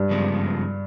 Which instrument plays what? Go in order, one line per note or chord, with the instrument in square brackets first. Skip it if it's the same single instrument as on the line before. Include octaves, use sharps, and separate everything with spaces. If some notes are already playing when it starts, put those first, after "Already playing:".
Already playing: [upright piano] G2
[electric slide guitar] F#2 C#3 F3 G#3 B3